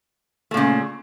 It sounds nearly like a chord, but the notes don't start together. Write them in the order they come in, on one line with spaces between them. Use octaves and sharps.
A3 A#2 C#3